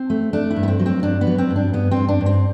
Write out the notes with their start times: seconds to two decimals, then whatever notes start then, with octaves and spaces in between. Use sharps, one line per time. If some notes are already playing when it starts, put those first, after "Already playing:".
Already playing: C4
0.10 A3
0.33 A3 D4
0.51 E4
0.56 G2
0.63 B3
0.68 C4
0.80 F#3
0.86 C4
1.03 G2 D4
1.21 B3
1.27 F#3
1.38 C4
1.50 G2
1.56 D4
1.73 G2 B3
1.91 C4
1.97 G2
2.08 D4
2.21 G2
2.26 C4